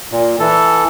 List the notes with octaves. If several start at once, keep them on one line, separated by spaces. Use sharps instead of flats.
A#2
E3 A4